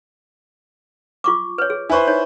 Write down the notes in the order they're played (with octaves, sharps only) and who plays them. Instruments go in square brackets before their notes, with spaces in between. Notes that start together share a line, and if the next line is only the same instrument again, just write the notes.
[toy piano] F4 C#6 D6
B4 C#5
G#4
[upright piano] E4 B4 C5 [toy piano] G#5 C#6
[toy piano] D#4 C#5